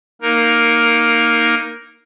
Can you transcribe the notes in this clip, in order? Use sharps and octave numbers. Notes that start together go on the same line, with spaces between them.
A#3 D#4 A#4